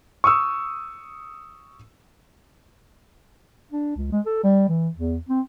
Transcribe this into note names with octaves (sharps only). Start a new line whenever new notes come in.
C#6 D#6 E6
D4
C#2
G#3
A4
G3
E3
E2
C4